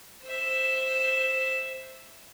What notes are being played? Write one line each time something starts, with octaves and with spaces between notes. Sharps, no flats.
C5 E5